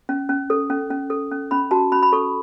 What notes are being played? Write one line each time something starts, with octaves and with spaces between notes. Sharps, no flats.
C#4
C#4
A4
C#4
C#4
A4
C#4
C#4 B5
F#4 A5
C#4 B5
B5
A4 C#6